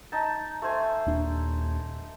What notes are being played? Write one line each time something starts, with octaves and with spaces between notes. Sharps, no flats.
D#4 A5
A3 C5 G#5
D#1 D#2 D4